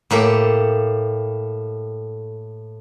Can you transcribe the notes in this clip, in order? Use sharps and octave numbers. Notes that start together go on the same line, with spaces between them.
A2 A#3 G4 A4